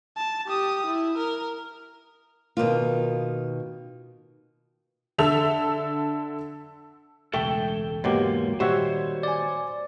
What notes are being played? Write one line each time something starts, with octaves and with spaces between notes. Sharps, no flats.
A5
G4 D#6
E4
A#4
B2 D#3 A#3 F4
D3 A4 E5 E6 F7
E1 C#2 A3 A4 G5
G#2 B2 F#3 A#3 G4
A#2 D#3 G3 F#4 C5 C#5 E5
D5 G#5